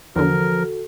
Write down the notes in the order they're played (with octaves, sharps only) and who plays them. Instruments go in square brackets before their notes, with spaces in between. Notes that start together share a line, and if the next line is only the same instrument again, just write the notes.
[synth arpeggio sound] E2 D3 [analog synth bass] F3 [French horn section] F#4 A4 [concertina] A#4